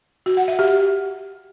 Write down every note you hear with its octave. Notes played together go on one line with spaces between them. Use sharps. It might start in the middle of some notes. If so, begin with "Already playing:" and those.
F#4
F#5
E5
G4